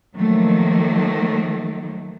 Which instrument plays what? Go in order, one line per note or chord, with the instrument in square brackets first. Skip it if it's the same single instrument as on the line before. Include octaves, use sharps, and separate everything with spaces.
[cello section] D#3 F3 F#3 A3 A#3